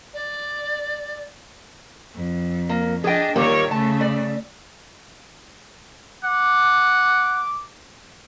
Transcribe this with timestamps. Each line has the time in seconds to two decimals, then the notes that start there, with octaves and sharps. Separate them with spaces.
0.14 D5
2.15 F2
2.69 A#3
3.04 D4 G#4 D#5 G5
3.36 A#2 D#3 G3 A#3 C#5
3.71 C#3 A3 A5
4.01 D5
6.24 F#5 D6